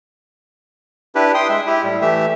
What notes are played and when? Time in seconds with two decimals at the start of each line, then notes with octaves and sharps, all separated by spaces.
1.15 D4 E4 G4 B4
1.34 G5 C6 D#6
1.49 G#3 E5
1.67 E4 G4
1.84 A2 G3
2.02 E3 A3 G4 E5